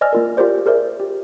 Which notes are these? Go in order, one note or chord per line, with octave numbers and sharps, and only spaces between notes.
C5 D5 D#5 G#5 E6 F6
A#3 F4 A#4
F4 G4 A#4 C5 D5
G#4 A#4 C5 D5 E5
G4